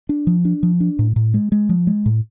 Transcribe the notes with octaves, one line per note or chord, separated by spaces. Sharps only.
D4
F3
D4
F3
D4
A2
A2
G#3
G#3
F3
G#3
A2